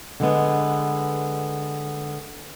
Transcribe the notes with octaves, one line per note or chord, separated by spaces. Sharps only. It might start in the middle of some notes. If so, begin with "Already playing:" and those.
D3 G#3 B3